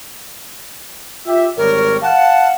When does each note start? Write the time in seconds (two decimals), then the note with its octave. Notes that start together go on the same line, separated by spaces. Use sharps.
1.26 F4 G4 E5
1.57 G#1 G3 A#4 C#5
2.02 F5 F#5 A5